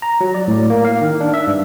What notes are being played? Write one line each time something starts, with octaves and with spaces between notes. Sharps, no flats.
A#5
F#3
D5
A2
A#3
F5
D#3
D4
E5
G2